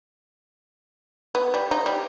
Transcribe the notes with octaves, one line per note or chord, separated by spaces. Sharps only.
B3
G3
D#4
G3